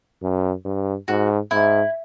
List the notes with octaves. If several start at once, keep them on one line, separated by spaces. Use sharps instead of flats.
F#2
G2
G#2 F#4
G#2 E4